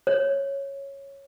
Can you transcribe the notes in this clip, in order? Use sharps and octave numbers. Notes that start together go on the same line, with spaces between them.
C#5